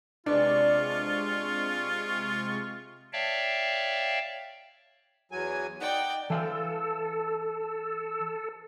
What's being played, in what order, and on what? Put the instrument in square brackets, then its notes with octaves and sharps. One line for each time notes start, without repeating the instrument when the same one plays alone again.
[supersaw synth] C3 G#3 C#6 [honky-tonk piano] D4 [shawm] F4 [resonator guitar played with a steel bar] B4 D5
[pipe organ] C#5 D5 E5 F5 G5 A5
[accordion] E2 F#3 G#5
[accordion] D#4 F#5 [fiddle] D5 G5
[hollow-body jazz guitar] E3 F5 [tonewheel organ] A4